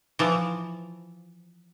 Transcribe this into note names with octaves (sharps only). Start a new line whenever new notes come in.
E3 F3